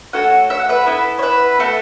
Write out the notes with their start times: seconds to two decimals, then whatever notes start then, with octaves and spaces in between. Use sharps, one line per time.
0.13 A3 F#4 A4 C#5 F#5
0.50 E5
0.59 F#5
0.69 B4 E5
0.86 B3 E4 A4
1.19 C#5
1.23 B4 E5
1.59 A3 F#4 A4